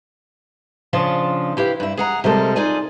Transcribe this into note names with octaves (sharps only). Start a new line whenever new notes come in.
C#3 F3 D4 F4
E4 G4 B4 F5
G2 E4
G#4 F#5 A#5
C3 F3 G3 G#3 A4 A#4
D#4 F4 G#4 D5 G#5